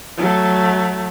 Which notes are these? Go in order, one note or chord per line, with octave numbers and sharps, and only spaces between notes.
F#3 A3